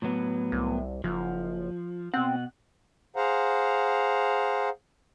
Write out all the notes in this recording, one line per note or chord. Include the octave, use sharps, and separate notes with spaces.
A2 F#3 B3
C2
F#1 F3
B2 C4 F#5
G#4 C5 F5 F#5 A#5